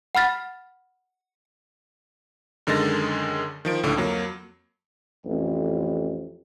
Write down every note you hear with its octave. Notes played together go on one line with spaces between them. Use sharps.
F#5 B5 F6 A6 B6
F#2 D3 D#3 G#3 A6 A#6
D#3 F3 D7
C#2 A2 D3
F2 F#3 A#3
A1 F2